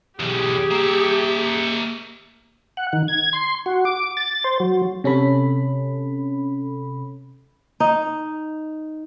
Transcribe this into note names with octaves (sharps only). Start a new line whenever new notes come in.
B1 E2 G4 G#4
A#3 E5
F#5
D#3
G#6
C6
F#4
D6
A6
C5
F#3
C3 C#4 A4 B5
D#4